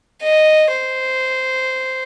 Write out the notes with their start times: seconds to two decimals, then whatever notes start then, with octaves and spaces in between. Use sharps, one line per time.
0.23 D#5
0.72 C5